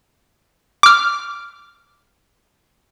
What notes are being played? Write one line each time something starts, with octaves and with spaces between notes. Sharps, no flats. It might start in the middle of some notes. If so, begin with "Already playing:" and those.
D6 F6